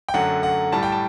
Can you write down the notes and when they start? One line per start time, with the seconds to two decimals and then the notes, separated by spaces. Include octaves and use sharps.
0.09 G5
0.14 F#2 D3 F#3 A3 F#5
0.43 F#5
0.72 A2 G3 A5
0.83 G5
0.92 A5